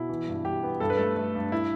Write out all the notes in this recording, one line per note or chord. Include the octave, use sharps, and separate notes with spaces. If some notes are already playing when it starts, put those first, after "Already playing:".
Already playing: B2 E4
E3
G2
G2 G4
B3
G2 A4
B4
A3 A4
A3
G2
E4